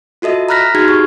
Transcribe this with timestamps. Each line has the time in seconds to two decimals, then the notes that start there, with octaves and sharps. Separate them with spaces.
0.22 F4 F#4 A4 D#5 E5
0.49 A#5 B5 F6 F#6 A#6 B6
0.75 D#4 F#4 G#4 F6 G#6
0.88 G4 C#6